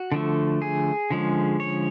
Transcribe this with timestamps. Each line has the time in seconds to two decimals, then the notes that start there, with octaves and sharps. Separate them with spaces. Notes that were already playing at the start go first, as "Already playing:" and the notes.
Already playing: F#4
0.12 D3 F3 A3
0.62 G#4
1.10 D3 F3 G#3 C#4
1.60 C#5